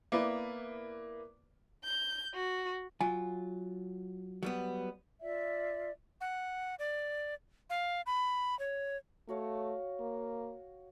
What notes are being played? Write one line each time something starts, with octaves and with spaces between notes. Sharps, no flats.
A#3 B3 E4 B4 D5
G6
F#4
F#3 F4 G#5
F#3 G3 B3
F4 D5 E5
F#5
D5
F5
B5
C#5
A3 F#4 C#5 F5
A#3